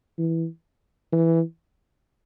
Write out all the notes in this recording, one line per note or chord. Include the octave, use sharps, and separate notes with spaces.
E3
E3